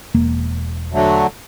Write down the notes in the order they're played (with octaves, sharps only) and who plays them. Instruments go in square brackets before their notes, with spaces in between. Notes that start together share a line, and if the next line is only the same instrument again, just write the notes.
[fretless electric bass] E1 A#3
[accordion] D3 F#3 A3